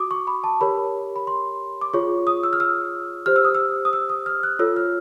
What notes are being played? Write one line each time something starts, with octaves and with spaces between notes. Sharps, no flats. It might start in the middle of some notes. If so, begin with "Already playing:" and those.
Already playing: F#4 D6 D#6
C#6
B5
A5
G4 A#4 C#5 B5
B5
C6
D6
F4 G#4 C#5 C#6
D#6
E6
F6
E6
G4 C5 F6
E6
D#6
E6
D#6
E6
D#6
F6
F#6
F4 A4 C#5 E6
F6